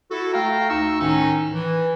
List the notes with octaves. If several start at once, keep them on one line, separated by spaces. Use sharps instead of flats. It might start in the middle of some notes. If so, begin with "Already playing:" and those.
E4 F#4 A4
A3 F5 G5 A#5
D2 D#4 C#6 E6
A2 D#3 C#4 D#4
E3